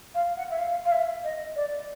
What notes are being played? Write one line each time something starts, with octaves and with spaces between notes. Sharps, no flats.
F5
F#5
E5
F5
F5
E5
D#5
D5